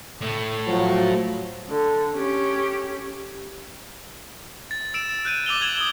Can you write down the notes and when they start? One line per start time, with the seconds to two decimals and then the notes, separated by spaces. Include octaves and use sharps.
0.21 A2
0.67 F3 F#3
1.69 D3
2.16 C#4 G4
4.71 A6
4.94 E6 D7 E7
5.25 F#6 G6 D#7
5.46 D6 E6 F7 G7
5.61 F#6 G#6 F7 F#7
5.77 D#6 G7